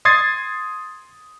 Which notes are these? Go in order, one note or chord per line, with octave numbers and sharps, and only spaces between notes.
C6 D#6 G#6 A6 C7